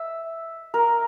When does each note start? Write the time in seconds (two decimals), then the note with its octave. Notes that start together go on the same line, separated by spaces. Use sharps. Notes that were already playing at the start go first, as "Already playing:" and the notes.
Already playing: E5
0.74 A#4